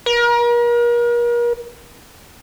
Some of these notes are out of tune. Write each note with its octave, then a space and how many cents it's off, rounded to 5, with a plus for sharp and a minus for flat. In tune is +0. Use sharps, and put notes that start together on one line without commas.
A#4 +40